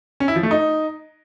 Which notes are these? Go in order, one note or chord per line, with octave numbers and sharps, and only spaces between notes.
C#4
E4
F3
A3
D#4